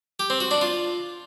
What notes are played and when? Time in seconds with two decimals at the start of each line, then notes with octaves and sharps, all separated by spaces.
0.19 G4
0.30 C4
0.40 F#4
0.51 D4
0.61 F4